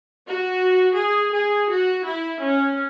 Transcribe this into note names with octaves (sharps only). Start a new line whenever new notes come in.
F#4
G#4
G#4
F#4
E4
C#4